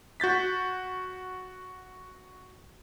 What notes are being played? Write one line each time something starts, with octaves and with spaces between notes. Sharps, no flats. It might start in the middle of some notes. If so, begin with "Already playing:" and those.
F#4 G6 A6 B6